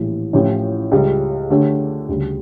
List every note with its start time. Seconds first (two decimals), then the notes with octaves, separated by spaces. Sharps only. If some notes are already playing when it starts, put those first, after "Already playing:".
Already playing: A#1 A2 E3 G3
0.33 A1 A2 F3 C#4 G4
0.92 C#2 C#3 G3
1.50 D3 A3 D4 G4 C#5
2.09 D2 C#3 G3